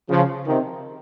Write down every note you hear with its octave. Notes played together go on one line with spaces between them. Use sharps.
C#3 F3
C3 D#3